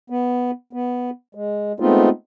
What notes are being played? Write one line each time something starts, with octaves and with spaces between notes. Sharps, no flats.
B3
B3
G#3
G#3 A3 B3 C4 D#4 F4